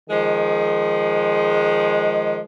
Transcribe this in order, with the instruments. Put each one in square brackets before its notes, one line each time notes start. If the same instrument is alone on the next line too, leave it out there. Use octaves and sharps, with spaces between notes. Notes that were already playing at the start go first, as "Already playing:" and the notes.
[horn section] D#3 F3 G#3